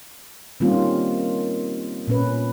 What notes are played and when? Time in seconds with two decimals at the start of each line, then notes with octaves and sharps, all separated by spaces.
0.60 D#3 G3 A#3 C4 C#4 F4
2.08 A#2 C#4 B4